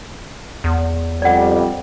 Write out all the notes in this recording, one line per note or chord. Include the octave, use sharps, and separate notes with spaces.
E2
F2 G3 D5 F#5